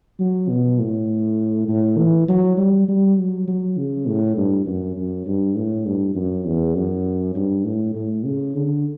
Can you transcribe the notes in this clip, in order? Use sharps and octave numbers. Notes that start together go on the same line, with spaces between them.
F#3
B2
A2
A2
E3
F#3
G3
G3
F#3
F#3
C#3
A2
G2
F#2
F#2
G2
A2
G2
F#2
E2
F#2
G2
A2
A2
C#3
D3